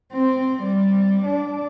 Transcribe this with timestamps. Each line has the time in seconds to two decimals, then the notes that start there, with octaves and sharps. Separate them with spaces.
0.11 C4
0.62 G3
1.24 D4